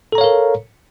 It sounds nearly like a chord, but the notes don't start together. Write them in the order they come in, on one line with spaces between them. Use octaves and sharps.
A4 A#5 C#5 F5 A#4